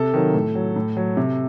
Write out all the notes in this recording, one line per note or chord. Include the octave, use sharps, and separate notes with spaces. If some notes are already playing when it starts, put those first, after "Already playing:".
Already playing: C3 A4
D#3 F#3
A2
F#3
A2
F#3
C3